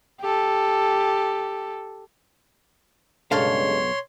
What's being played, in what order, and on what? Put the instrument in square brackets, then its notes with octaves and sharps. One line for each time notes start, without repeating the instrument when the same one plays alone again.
[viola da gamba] G4 A4
[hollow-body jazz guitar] B1 A4 F5 [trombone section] G2 C#3 G#3 [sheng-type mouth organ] C#5 C6